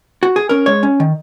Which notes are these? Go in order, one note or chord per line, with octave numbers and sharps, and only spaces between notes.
F#4
G#4
C#4 A#4
G#3 C#5
C#4
D#3